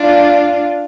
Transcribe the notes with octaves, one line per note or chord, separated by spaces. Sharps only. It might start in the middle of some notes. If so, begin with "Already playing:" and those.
Already playing: D4 F4